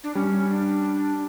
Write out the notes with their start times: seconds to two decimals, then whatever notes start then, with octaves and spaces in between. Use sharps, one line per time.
0.04 D4
0.15 G3 C#4
0.50 D4